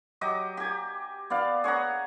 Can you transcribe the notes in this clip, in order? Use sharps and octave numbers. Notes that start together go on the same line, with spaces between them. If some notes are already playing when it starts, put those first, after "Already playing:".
F#3 G4 D#5 D6
G4 G#5
B3 D5 F5
G#4 C#5 F#5 A#5